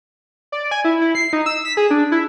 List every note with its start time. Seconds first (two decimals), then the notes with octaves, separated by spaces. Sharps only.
0.52 D5
0.71 G#5
0.85 E4
1.01 E4
1.15 C7
1.33 D#4
1.46 E6
1.65 B6
1.77 G#4
1.91 D4
2.12 E4